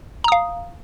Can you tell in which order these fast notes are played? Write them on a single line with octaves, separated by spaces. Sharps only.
A#5 D#6 F5